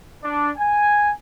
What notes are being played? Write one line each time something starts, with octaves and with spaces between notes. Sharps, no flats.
D4
G#5